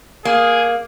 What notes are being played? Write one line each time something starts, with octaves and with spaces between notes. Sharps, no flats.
A#3 G#4